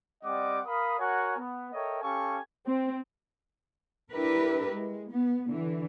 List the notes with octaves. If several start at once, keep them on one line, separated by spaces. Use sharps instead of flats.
G3 C4 D5 D#5 F#5 D6
A#4 F5 B5 D#6
F#4 A#4 C#5 F#5 G#5
B3
A4 A#4 C#5 D#5 E5 G5
C#4 G4 A4 F5 G#5 C#6
C4
D4 E4 G4 A#4 B4
G#3
B3
D3 E3